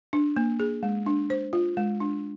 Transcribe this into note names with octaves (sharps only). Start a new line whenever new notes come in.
D4
A#3
G#4
G#3
D4
C5
F4
G#3
D4